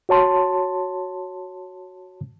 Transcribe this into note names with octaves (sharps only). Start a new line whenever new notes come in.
F#4 C#5 A5 C6